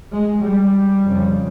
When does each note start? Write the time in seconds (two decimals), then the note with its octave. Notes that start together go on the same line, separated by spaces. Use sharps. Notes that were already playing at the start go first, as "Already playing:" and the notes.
0.13 G#3
0.43 G3
1.02 F2 C#3